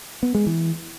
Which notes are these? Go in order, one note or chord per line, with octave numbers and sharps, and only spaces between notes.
B3
G#3
E3